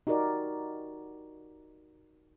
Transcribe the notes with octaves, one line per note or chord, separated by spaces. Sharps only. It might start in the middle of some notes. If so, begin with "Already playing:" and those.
D#4 F#4 G4 A#4 D5